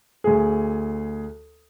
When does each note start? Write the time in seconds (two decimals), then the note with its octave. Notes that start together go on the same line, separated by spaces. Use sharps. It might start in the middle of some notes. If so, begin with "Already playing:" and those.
0.24 D2 G#4